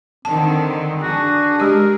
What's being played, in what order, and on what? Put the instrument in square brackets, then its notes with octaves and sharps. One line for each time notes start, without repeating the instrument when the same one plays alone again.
[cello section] D3 D#3 [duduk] C4 [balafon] A5
[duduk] D4 [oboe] F#4 [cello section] G#4
[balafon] G#3 G4 [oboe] A#4